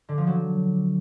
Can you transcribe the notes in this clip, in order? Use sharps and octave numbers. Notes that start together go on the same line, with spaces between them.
D3
F3
F#3